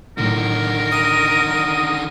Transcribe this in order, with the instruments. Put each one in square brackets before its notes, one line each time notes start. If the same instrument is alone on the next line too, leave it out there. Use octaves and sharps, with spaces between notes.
[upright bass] A2 F#3 [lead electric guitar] D3 D#3 [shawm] A#4
[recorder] D#6